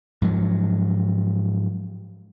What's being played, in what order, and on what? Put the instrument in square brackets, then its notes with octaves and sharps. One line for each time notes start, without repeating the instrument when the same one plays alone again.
[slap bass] G#2 F3 F#3